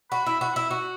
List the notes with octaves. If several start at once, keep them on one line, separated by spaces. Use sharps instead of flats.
F#4 B5
E4
F#4
E4
F#4